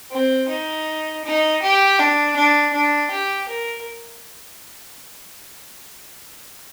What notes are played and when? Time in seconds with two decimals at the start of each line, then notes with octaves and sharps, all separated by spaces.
0.11 C4
0.49 D#4
1.25 D#4
1.62 G4
1.99 D4
2.36 D4
2.73 D4
3.11 G4
3.49 A#4